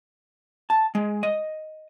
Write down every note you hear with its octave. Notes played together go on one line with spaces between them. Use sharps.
A5
G#3
D#5